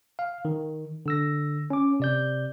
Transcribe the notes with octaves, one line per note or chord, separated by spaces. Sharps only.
F5
D#3
D3 E6 A#6
C#4 D6
C3 D5 G6